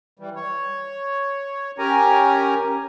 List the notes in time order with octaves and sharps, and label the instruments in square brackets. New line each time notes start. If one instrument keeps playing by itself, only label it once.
[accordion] E3 G3
C#5
C#4 G4 A#4 G#5 A#5